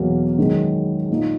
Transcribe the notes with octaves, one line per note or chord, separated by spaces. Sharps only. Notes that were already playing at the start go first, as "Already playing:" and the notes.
Already playing: E2 B2 F#3 A#3
F#2 D#3 G#3
A#2 A#3 D#4